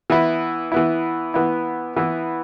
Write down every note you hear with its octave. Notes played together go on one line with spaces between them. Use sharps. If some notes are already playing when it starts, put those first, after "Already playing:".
E3 B3 E4
E3 B3 E4
E3 B3 E4
E3 B3 E4